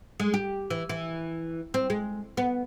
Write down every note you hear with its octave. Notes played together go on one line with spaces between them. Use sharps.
G#3
G4
E3
E3
C4
G#3
B3